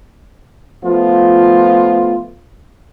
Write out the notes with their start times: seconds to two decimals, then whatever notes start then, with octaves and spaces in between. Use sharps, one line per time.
0.84 F3 A3 B3 F4